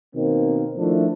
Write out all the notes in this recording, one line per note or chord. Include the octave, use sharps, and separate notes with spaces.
B2 D#3 A#3 C4
D#3 F3 A3 D4 E4